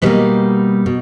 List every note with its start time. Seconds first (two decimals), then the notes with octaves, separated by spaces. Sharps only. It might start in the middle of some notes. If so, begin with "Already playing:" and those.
0.02 B2 G3 A#3 B3 D#4
0.86 B2